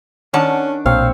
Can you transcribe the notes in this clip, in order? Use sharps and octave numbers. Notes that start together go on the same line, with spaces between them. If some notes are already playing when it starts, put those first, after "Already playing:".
D#3 C#4 D4 F#5 A5 D6
B1 A#2 C4 C#5 F5